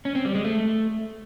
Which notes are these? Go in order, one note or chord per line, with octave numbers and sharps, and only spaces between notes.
C#4
C4
G3
G#3
A3